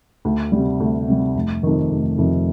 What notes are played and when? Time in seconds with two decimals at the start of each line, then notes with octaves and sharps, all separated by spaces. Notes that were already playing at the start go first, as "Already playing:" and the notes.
0.25 D2
0.52 C3 G3
0.80 D2
1.08 C3 G3
1.35 F1
1.63 F2 C3 D#3
1.91 F1
2.18 F2 C3 D#3